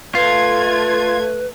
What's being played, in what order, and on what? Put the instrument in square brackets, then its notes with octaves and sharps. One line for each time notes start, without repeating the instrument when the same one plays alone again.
[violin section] A3 G#6 [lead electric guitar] F4 [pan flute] B4